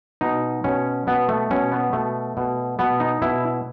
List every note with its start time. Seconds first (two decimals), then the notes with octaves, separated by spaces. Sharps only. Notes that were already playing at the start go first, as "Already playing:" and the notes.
0.21 B2 D#4
0.64 B2 C#4
1.07 B2 B3
1.29 A3
1.50 B2 C#4
1.72 B3
1.93 B2 A3
2.37 B2
2.79 B2 B3
3.00 D#4
3.22 B2 E4